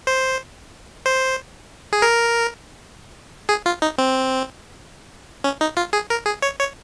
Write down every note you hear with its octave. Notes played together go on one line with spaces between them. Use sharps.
C5
C5
G#4
A#4
G#4
F4
D#4
C4
C#4
D#4
F4
G#4
A#4
G#4
C#5
C#5